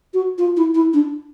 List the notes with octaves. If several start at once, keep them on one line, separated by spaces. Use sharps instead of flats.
F#4
F4
E4
E4
D4